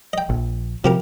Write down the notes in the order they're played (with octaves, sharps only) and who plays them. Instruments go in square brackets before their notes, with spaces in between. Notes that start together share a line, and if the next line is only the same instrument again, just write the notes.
[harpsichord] D#5 G5
[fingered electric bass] A#1
[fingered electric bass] C3 [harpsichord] F3 G4 A#4